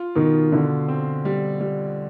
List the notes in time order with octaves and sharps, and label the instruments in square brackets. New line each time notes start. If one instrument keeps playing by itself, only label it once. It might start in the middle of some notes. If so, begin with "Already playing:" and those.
Already playing: [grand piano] F4
[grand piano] B2 [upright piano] D#3
[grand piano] B2 [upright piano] D3
[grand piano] C4
G3
G3